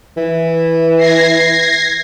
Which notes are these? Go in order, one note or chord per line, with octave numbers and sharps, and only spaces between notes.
E3
G#6 A#6 C7